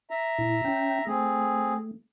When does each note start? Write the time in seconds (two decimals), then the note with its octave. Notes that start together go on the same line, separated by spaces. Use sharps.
0.10 E5 A#5
0.38 A#2 E4
0.64 C#4 G5
1.07 A3 C4 G#4